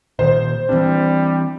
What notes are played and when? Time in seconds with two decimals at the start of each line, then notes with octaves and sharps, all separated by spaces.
0.19 A#2 D#3 C5
0.69 E3 G3 C4 D4